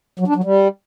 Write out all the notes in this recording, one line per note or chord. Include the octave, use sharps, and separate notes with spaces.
F#3
D4
F#3
G3